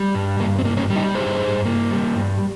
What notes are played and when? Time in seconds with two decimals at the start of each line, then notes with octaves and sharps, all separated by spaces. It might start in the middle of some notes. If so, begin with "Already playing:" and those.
Already playing: G3
0.15 G2
0.40 G2 A#3
0.58 C4
0.65 A#3
0.77 A#3 C#4
0.90 G3
0.96 D#4 G4
1.14 G2 G#4 C5
1.40 G2
1.65 A#3
1.91 G3
2.16 G2